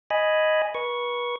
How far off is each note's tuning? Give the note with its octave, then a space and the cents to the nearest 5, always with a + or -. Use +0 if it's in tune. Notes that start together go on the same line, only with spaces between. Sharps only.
D#5 +0 G#5 +0 B5 +0
B4 -35 C#6 +0